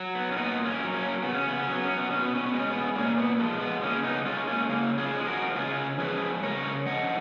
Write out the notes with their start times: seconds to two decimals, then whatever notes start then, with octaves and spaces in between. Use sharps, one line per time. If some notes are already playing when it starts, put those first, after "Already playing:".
Already playing: F#3
0.15 B3
0.31 C#4
0.36 A#2 B3 D#4
0.64 A#3 C#4
0.79 F#3
0.94 A#3 C#4
1.23 C#3 B3
1.35 C#4
1.48 B3
1.59 C#4
1.67 F#3
1.72 B3
1.85 C#4
1.97 B3
2.10 B2 C#4
2.22 B3
2.35 C#4
2.46 B3
2.53 G#3
2.60 C#4
2.71 B3
2.96 A#2 A#3 C#4
3.18 B3
3.39 F3 G#3 A#3
3.61 B3
3.83 C#3 A#3 C#4
4.04 B3 D#4
4.26 G#3 C#4 F4
4.47 A#3 C#4
4.69 C#3 A#3
4.98 F4 G#4
5.13 F3 G#3
5.27 F#4 A#4
5.56 C#3 F4 G#4
5.99 F3 G#3 G#4 B4
6.43 C#3 A#4 C#5
6.86 F3 G#3 D#5 F#5